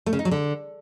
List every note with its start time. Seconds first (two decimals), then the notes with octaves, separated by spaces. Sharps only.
0.06 A3
0.13 C#3
0.19 D#4
0.25 F#3
0.31 D3